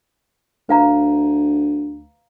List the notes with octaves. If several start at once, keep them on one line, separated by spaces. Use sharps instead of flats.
D2 B4 F5 A#5